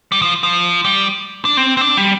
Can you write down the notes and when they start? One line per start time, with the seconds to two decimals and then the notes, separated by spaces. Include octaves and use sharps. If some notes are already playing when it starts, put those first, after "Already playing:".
0.12 G3
0.22 F3
0.43 F3
0.85 G3
1.45 D4
1.57 C4
1.77 C4
1.81 D4
1.97 G3